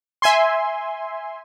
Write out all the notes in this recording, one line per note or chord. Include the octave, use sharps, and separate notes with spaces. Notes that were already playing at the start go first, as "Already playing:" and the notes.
E5 G#5 C6